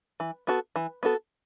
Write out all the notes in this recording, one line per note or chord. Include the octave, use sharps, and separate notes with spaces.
E3
B3 F#4 A4
E3
B3 F#4 A4